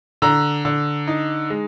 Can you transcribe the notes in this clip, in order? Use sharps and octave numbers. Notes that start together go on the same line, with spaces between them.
D3 A#5
D3
D#4
G#3